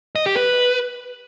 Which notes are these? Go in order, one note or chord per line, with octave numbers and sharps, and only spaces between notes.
D#5
G4
B4